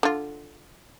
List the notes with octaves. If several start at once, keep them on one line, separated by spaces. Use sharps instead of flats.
D3 F4